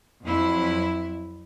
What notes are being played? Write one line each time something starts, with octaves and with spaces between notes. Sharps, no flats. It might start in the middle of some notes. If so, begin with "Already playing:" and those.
F2 F#3 E4